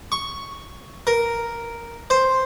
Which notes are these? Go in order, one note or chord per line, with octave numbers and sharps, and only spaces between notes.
C#6
A#4
C5